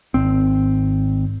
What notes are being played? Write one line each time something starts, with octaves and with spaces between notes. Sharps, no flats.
G#1 C4